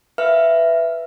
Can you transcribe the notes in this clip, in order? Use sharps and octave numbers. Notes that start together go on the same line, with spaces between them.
B4 E5 F5 F6